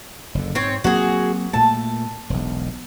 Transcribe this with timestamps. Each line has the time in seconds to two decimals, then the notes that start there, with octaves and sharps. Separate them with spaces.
0.35 F#1 D3
0.55 G#2 C4 C#5
0.84 F#3 A#3 C4 F#4 G#4
1.53 A#2 A3 A5
2.30 E1 B1